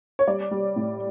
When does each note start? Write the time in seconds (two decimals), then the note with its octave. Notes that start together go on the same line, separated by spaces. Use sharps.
0.19 C#5
0.28 G3 D5
0.51 G3
0.76 A2